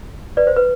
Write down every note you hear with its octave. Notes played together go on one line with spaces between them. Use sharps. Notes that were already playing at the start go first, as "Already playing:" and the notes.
B4 D5
C5
B4